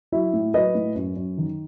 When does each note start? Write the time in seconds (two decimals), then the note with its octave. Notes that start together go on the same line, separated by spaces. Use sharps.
0.12 F#3 E4
0.33 A2
0.54 F#3 B4 D#5
0.75 A2
0.95 F#2
1.16 F#2
1.38 D#3